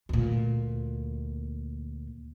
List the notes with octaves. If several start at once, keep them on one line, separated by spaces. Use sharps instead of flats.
D2 A#2